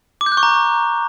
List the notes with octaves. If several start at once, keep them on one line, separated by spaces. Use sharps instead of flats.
D6
G6
F#6
C#6
A#5